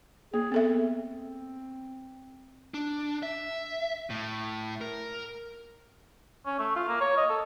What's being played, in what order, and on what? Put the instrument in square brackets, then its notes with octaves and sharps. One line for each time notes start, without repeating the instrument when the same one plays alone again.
[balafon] A#3 [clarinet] G#4
[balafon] B3 A4 E5 [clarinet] C4
[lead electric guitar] D4
E5
A2
A#4
[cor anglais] C#4
A3
F4
A#3
C#5
D#5
A4